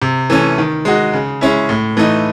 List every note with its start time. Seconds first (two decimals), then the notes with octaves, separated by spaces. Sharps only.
0.02 C3
0.30 E3 A3 C#4
0.58 D#3
0.85 G#3 D#4 F#4
1.13 C#3
1.41 G#3 C#4 E4
1.69 A2
1.97 E3 A3 D#4